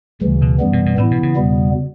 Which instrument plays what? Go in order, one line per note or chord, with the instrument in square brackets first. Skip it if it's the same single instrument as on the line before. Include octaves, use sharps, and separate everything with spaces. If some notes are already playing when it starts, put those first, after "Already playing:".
[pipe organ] D2 C#3 E3 [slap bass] G3
[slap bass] B2
[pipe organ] F#2 E3 G3 B3
[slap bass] B2
B2
[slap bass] A2 [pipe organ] E3 B3 E4
[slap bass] B2
C#3
[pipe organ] E2 B2 G3 B3